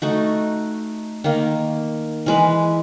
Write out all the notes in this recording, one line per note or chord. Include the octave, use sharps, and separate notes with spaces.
A3 D#4 F#4
D#3 A#3
E3 G#3 B4